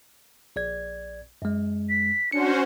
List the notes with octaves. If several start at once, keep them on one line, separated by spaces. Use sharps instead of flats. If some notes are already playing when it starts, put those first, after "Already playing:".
A#1 D5 G#6
F#2 G#3
B6
C#4 D4 F#4 C5 C#7